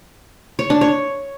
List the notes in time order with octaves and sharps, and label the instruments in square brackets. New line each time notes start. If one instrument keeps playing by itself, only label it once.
[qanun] C#5
D4
C#5